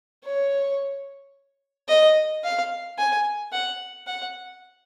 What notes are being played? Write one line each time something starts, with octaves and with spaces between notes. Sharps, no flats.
C#5
D#5
F5
G#5
F#5
F#5